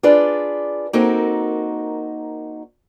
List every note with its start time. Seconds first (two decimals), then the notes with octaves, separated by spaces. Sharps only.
0.03 D4 F4 G#4 B4 D5
0.93 A#3 C4 D#4 F#4 A4 A#4